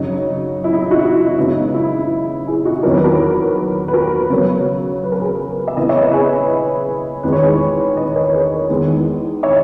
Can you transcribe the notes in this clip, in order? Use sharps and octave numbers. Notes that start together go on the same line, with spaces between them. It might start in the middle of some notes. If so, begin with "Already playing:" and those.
Already playing: F#2 C#3 F#3 D#4
E4
D#4
E4
D#4 F#4
E4
F#2 C#3 G#3 B3 D#4
E4
E4 G#4
D#4 F#4
E2 D#3 F#3 B3 A#4
B4
F#4 A#4
B4
F#4 A#4
C#3 F#3 B3
B4
A#4
G#4 B4
E5
C#3 E3 B3 B4 D#5
C#5 E5
B4 D#5
G#4 B4
E2 D#3 G#3 B4
C#5
G#4 B4
B4 D#5
A#4 C#5
C#5
G#4 B4
E2 D#3 G#3 B3
C#5 E5